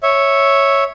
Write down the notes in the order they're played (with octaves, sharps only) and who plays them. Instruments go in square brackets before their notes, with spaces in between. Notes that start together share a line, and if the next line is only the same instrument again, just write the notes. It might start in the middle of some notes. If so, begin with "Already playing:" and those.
[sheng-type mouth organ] C#5 E5